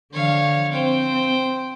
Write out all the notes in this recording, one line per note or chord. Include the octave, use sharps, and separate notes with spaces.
D3 F3 C#5 F5
C4 C5 G5